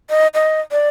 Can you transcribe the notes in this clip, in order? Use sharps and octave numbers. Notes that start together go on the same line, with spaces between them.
D#5
D#5
D5